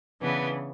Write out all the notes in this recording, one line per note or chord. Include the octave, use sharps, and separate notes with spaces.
C#3 E3 B3 D4